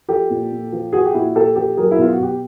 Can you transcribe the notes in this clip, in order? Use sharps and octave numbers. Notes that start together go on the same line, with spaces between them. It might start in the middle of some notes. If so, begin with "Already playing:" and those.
F3 G4 A4
A#2
A#2
F3
F3 F#4 G#4
G4
A#2 E4 F#4
A#2 G4 A4
F3 G4 A4
F#3 G#4 A#4
E4
B2 F4
F#4
B2 G4